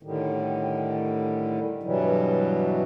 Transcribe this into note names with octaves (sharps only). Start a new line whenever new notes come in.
A2 D3 D#3 G3
G2 B2 E3 F#3 G3